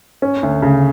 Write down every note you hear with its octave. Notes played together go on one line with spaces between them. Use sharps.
C#4
D2
C#3